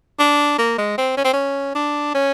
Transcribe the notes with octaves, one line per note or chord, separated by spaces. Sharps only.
D4
A#3
G#3
C4
C#4
C4
C#4
D4
C#4